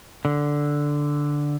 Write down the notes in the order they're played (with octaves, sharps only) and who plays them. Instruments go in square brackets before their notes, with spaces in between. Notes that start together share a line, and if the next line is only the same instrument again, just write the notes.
[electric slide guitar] D3